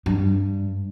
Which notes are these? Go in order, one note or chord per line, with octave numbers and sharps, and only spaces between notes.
G2